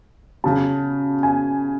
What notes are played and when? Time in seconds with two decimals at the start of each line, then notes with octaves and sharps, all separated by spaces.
0.44 C#3 F#3 A5
1.23 G#5